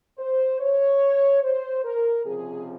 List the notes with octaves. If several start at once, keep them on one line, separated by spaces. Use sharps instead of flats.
C5
C#5
C5
A#4
C#2 C3 F3 G#4